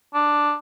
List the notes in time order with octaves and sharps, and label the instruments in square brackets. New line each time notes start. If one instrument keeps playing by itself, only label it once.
[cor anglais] D4